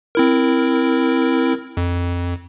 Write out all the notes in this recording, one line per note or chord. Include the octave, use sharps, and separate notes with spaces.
C4 E4 A#4
F2